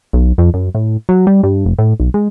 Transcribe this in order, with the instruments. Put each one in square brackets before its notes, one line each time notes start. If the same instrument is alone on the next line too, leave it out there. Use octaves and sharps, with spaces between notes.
[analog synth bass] B1
F2
F#2
A2
F#3
G3
G2
F1
A2
B1
G#3